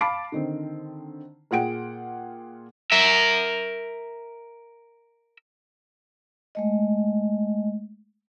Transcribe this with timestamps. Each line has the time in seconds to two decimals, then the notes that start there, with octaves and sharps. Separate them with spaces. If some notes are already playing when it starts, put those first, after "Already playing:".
0.01 F5 A5 B5 D6 C7 D7
0.32 D3 D#3 C4
1.51 A#2 F4 G#4 F#5 G5 D7
2.92 A#4 E5
6.55 G#3 A3 D#5